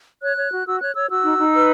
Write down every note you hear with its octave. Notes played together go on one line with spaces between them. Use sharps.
C#5 F#6
C#5
F#4
F#4 E6
C#5 F#6
C#5 E6
F#4 E6
D#4
D#4
B4